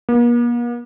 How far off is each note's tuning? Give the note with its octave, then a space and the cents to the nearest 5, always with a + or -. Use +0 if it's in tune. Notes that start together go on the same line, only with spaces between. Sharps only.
A#3 +45